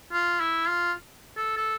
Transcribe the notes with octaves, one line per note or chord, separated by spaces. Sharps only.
F4
E4
F4
A4
A4